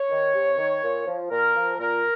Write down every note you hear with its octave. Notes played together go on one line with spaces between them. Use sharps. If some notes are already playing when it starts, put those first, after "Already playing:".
Already playing: C#5
D#3
C3
D#3
A#2
F3
A#2 A#4
F3
A#2 A#4